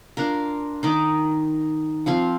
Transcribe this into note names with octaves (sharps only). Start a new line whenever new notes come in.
D4 F4 A#4
D#3 D#4 D6
F3 C4 F4 F5